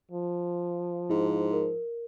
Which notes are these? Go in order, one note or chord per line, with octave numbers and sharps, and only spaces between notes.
F3
G#2 E4
A#4